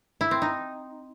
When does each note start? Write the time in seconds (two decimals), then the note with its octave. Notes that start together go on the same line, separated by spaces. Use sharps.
0.21 E4
0.31 C4
0.42 D#4